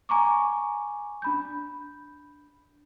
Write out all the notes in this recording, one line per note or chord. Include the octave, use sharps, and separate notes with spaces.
G#5 A#5 C#6 D6
D4 B5 G6